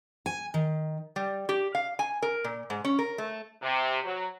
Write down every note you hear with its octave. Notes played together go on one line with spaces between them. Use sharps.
G#5
D#3
G3
G4
F5
G#5
A#4
A#2
G#2
C#4
A#4
A3
C3
F#3